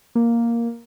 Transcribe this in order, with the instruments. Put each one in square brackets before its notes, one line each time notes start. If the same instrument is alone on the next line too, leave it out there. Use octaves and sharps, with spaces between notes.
[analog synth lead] A#3